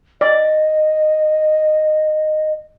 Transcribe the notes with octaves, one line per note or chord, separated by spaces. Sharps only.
D5 D#5